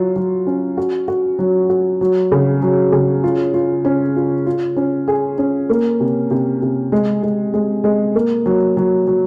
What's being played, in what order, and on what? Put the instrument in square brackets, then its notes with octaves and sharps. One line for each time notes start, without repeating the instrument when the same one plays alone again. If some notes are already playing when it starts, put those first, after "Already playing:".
Already playing: [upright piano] F#3 F4
F#3
C#4
F#4
F#4
F#3
F#4
F#3
C#3
F#3
C#3
F4
F4
C#4
F4
F4
C#4
G#4
C#4
A#3
C3
C3
C3
G#3
G#3
G#3
G#3
A#3
F#3
F#3
F#3